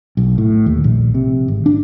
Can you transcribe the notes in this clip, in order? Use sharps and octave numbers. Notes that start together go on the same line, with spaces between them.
B1
A2
D#2
A#1
C3
G#1
D4